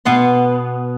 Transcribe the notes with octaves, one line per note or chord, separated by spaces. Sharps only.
B2 B3 F#5 C6